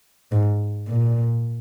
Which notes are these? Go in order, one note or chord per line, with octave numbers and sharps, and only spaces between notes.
G#2
A#2